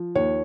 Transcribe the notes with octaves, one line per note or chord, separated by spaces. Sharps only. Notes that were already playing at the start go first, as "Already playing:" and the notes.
Already playing: F3
D#2 C#5